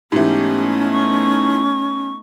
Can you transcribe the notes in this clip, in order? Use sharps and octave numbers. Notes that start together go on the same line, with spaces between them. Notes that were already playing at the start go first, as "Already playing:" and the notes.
G#2 E3 A3 B3 C#4 D#4 G4
C#6